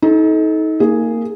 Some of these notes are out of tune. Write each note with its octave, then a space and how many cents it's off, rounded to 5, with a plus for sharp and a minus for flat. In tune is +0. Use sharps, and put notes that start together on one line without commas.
D#4 +30 A4 -25
A#3 -20 G#4 +0